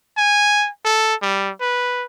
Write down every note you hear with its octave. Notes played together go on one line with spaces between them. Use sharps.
G#5
A4
G3
B4